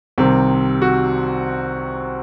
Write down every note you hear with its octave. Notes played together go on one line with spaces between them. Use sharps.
C2 C3 D#3 C4
F#4